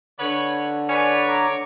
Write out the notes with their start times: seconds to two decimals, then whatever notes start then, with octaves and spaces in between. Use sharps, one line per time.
0.20 D3 B4 C#5
0.89 B4 C#5 D5
1.27 A3 A#5 D6